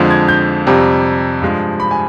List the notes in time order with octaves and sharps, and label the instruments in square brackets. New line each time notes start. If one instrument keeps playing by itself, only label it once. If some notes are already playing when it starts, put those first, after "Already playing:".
Already playing: [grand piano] F2 D3 F3 G#3
G#6
G6
F2 C3 G3
G2 F3 G#3
B5
G#5